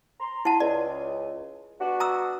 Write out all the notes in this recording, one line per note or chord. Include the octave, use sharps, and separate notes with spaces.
A#5 C6
E4 F#5 A5
C#2 D5
B3 D4 F#4
A#5 D#6 E6